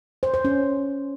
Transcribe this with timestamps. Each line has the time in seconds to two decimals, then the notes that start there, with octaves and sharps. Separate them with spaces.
0.23 C5
0.34 C5
0.45 C#4